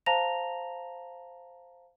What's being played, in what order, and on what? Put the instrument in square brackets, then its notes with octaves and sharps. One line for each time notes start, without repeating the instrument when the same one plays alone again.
[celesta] C5 F5 A5 A#5 A#6 F7